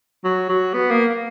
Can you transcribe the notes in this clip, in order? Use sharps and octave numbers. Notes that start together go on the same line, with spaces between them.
F#3
F#3
B3
A#3